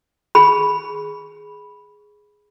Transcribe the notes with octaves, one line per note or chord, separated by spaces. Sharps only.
G#4 B5